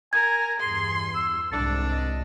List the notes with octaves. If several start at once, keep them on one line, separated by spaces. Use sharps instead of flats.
A#4 G#5 G#6
E2 G2 G#4 C6
E6
C2 G#2 D4 A4
D#5